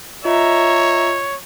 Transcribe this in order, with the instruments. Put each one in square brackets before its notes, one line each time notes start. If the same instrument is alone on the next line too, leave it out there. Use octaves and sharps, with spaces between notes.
[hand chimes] F4 D#5 [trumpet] C#5 [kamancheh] E5 A#5